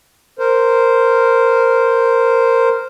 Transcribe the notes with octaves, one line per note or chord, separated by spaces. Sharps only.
A#4 C5